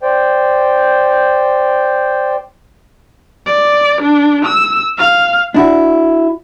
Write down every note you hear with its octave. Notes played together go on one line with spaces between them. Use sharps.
C5 D5 G5
D5
D4
E6
F5
D4 E4 F#4